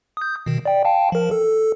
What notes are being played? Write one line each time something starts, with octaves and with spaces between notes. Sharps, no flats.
D#6 G6
B2 D#3
D5 G5
F5 G5 A5
F3 A#4
A4